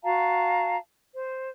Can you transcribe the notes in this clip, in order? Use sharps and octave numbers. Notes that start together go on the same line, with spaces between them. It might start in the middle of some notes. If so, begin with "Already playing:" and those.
F#4 F5 A5 A#5
C5